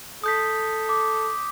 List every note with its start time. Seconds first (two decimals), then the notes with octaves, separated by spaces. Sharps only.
0.24 A4 D#6 G6 B6
0.89 D6